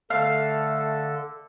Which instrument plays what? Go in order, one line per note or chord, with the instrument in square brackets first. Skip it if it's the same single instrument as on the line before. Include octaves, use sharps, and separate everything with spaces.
[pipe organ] D3 A4 [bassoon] A3 [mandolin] F5